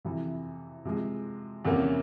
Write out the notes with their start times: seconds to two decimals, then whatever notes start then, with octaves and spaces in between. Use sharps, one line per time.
0.05 F2 C3 E3
0.85 C3 F3 G#3
1.65 E2 C3 E3 A#3 C#4